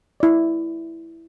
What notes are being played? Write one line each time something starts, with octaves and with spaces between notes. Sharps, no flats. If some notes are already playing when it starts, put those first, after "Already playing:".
E4 D5